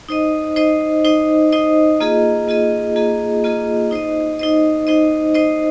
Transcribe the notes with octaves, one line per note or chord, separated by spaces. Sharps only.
D#4 C5 D#5
D#4 C5 D#5
D#4 C5 D#5
D#4 C5 D#5
A#3 F4 G#4 D#5
A#3 F4 G#4 D#5
A#3 F4 G#4 D#5
A#3 F4 G#4 D#5
D#4 C5 D#5
D#4 C5 D#5
D#4 C5 D#5
D#4 C5 D#5